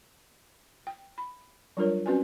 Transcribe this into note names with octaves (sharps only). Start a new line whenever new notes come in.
G5
B5
F#3 G3 D4 F4 A#4 C#5
C4 C#4 F#4 B4 D5 G#5